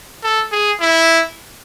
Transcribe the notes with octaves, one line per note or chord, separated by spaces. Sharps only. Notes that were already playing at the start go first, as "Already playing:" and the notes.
A4
G#4
E4